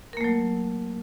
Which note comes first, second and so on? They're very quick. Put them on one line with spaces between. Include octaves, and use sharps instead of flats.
A#4 A#3 A3 F#3